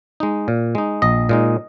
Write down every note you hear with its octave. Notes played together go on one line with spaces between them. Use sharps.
G#3 D#4
A#2
G#3 D#4
A#1 D#5
A#2 G#3 D#4